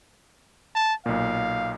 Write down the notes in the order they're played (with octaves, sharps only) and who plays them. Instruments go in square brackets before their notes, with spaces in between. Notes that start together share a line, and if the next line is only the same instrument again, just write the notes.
[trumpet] A5
[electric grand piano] B1 A#2 [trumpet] F5